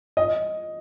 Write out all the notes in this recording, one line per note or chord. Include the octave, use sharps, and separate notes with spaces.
D#5